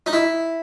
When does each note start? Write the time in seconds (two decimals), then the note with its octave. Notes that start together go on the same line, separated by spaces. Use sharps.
0.06 D#4
0.13 E4